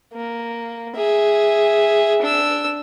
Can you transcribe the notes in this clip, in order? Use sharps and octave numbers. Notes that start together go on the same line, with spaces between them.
A#3
G#4 E5
D4 E6